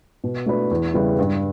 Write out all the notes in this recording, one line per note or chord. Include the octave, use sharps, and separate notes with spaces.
B2
A3 D4 F#4 B4
E2
C#3 G3 B3 E4
G2